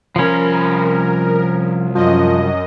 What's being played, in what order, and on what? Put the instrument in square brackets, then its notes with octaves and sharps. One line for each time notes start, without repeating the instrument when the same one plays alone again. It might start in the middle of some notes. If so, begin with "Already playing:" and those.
[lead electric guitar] C2 B5 [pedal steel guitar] F3 C#4 [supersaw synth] A#4
[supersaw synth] F#2 D#5 [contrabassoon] F3